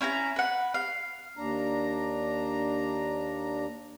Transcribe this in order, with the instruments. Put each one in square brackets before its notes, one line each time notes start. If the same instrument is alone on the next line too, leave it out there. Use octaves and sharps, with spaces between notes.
[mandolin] C#4 E4 G#5 A#5
B4 F#5
F5
[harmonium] D#2 D4 A#5